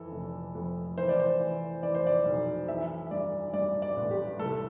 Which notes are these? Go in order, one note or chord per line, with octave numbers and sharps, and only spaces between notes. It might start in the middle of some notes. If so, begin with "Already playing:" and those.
Already playing: F2 E3 A4
F1
F2
E3 C5
D5
C5
E3
E3 D5
C5
D5
B1
E3 E5
E5
G2 D5
G2 D5
D5
A1
G4
C2 A4